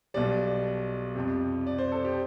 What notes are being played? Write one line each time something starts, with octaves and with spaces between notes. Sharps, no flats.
B1 B2 G3 D5
F2 C3 G3
D5
C5
A4
G4